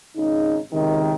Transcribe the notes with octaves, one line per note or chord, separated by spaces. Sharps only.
G#1 C#3 D#4
C#2 C3 D#3